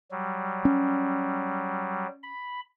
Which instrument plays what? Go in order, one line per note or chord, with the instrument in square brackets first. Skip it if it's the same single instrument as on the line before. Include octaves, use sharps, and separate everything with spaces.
[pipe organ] F#3 G3
[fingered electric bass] C#4
[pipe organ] B5